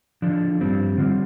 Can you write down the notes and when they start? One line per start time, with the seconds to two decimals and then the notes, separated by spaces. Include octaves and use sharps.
0.22 D3 F3 D4
0.61 G2 G3 C4
0.98 D3 G3 C4 F4